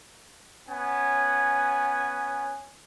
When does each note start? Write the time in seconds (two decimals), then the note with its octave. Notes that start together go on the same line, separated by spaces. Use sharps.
0.67 B3 C#4 G#5